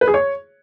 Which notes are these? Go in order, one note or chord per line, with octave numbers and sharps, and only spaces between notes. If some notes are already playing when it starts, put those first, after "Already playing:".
B4
G#4
C#5